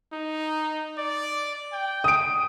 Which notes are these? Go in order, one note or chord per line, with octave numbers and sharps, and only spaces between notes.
D#4
D5
G5
D#6 D7